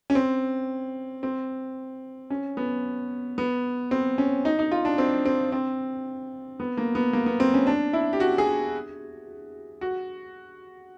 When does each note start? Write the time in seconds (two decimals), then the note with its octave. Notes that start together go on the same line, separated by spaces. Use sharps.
0.10 C#4
0.15 C4
1.23 C4
2.30 C#4
2.57 B3
3.38 B3
3.91 C4
4.18 C#4
4.45 D#4
4.59 D#4
4.72 F4
4.85 D4
4.98 C4
5.26 C4
5.52 C4
6.60 B3
6.77 A#3
6.95 B3
7.13 A#3
7.26 B3
7.40 C4
7.54 C#4
7.67 D4
7.93 E4
8.13 G4
8.20 F#4
8.38 G#4
9.81 F#4